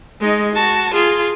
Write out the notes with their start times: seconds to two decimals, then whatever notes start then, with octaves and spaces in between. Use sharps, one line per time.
0.21 G#3 D#4
0.54 F#4 A5
0.94 F4 G#4